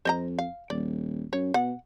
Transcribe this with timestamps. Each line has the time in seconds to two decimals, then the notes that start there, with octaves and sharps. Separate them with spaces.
0.05 F2 C5 D#5 A#5
0.39 F5
0.70 D#1 D5
1.33 F#2 C#5
1.54 B2 F#5